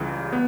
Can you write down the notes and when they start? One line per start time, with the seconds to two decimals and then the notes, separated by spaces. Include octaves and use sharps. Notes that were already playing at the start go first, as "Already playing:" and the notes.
Already playing: C#2 C#3 E3 G3
0.33 B3